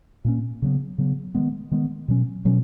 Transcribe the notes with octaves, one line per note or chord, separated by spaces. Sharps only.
A#2 A#3 C#4
C#3 F#3 B3
C#3 F#3 B3
D#3 G#3 B3
D#3 G#3 B3
B2 F#3 C#4
B2 F#3 C#4